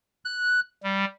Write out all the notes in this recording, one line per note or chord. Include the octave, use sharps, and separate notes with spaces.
F#6
G3